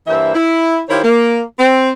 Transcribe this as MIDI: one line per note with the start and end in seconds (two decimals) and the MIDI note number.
0.07 0.32 43
0.07 0.32 52
0.07 0.32 58
0.07 0.32 72
0.07 0.32 76
0.35 0.81 64
0.89 1.00 51
0.89 1.00 64
0.89 1.00 65
0.89 1.00 67
0.89 1.00 72
0.89 1.00 73
1.03 1.41 58
1.59 1.91 60